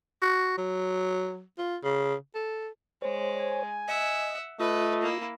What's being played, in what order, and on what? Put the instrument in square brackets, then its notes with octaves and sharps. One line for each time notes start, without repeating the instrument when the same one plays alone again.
[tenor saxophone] F#4
F#3
F4
C#3
A4
[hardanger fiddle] G#3 [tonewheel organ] C5 C#5
[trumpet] G#5
[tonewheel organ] D#5 [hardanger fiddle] E5 F#5
[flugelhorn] A3 [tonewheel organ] F4 [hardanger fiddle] B4 [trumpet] D#5
[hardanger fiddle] A#3 E4